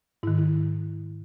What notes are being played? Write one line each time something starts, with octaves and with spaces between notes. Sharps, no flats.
G#2 D#3 E4
E4